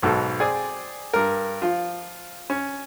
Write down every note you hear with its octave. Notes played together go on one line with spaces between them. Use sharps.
B1 G#2 B2 A4
C4 G#4 D5
G2 A#4
F3 F4
C#4